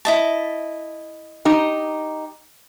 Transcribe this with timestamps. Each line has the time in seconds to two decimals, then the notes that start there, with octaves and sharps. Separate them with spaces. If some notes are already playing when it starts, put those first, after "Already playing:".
0.05 E4 D#5 A5
1.45 D#4 G4